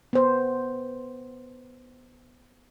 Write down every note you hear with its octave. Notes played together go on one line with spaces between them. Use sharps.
B3 C5